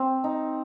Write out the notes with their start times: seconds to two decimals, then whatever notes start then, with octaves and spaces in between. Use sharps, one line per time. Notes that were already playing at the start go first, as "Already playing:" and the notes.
Already playing: C4
0.24 D#4